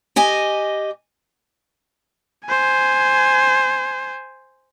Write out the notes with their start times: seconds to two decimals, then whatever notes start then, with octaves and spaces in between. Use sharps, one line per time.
0.16 G4 D#5 G#5
2.46 C5 G#5